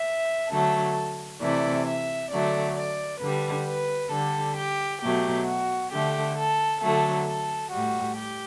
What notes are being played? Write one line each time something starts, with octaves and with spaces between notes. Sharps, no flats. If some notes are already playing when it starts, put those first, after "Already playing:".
Already playing: E5
D3 F#3 A3 A4
C3 E3 A3 D5
E5
D3 F#3 A3 D5
D5
D3 G3 B4
B4
D3 G3 A4
G4
B2 F#3 A3 G4
F#4
D3 A3 G4
A4
D3 F#3 A3 A4
A4
A2 G3 F#4
G4